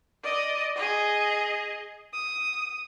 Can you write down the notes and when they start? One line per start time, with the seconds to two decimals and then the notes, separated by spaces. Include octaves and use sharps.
0.23 D5 D#5
0.76 G#4 D#5
2.13 D#6